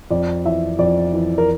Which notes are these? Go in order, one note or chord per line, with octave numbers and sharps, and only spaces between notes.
F2 D5
E3 E5
F2 D5
E3
A#4